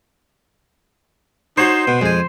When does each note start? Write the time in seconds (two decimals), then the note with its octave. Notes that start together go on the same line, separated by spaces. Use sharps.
1.57 D#4 F#4 C5 C#5
1.87 B2 B3
2.01 F2 G#3 G#5